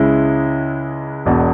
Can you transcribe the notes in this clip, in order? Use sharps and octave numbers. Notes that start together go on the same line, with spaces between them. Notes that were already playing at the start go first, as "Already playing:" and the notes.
Already playing: C#2 C#3 G#3 E4
E1 E2 B2